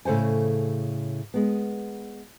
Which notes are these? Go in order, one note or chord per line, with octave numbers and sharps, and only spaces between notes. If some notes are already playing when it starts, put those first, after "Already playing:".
A2 C#3 A4 C5 G#5
G#3 B3